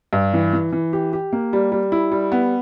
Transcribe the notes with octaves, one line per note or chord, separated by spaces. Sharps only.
G2
E3
E3
E3
G4
G4
A#3
G3
G3
E4
G3
B3